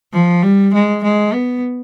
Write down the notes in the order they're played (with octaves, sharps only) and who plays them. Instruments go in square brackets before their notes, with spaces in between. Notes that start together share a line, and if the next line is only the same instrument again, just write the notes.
[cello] F3
G3
G#3
G#3
B3